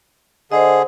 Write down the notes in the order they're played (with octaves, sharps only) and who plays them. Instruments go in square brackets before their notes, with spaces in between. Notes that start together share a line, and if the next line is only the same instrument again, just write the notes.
[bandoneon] D3 G#4 [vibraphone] C5 D#5